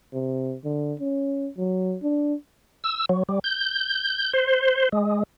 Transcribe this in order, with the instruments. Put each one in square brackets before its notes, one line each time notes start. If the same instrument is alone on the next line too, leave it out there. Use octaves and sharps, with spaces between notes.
[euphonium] C3
D3
C#4
F#3
D4
[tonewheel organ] E6
F#3
G3
G6
C5
G#3